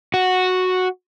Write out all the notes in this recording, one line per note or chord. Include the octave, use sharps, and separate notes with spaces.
F#4